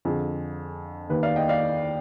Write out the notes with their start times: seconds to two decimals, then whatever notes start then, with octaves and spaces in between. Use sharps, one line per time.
0.05 F2 D3 F3 G#4
1.09 D#2 D#3 B4
1.23 D5 F5
1.36 D#5 G5
1.49 D5 F5